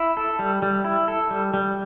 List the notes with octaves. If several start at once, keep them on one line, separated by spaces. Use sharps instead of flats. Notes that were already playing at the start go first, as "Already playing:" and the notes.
Already playing: E4
A4
G3
G3
E4
A4
G3
G3